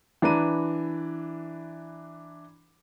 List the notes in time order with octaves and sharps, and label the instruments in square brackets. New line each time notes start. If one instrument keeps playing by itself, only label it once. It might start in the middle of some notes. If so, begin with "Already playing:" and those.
[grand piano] E3 D4 B4 A#5 D#7